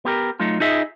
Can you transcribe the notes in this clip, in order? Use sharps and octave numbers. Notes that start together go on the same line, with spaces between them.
B3 G4 A#4
F#3 A3 D#4 F4
D#4 F4 G#4 D#5 E5